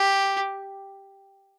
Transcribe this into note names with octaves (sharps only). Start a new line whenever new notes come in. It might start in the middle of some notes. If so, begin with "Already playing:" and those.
Already playing: G4